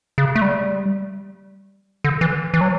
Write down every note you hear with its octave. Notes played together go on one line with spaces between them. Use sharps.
C#3
A3
G3
D3
E3
E3
F#3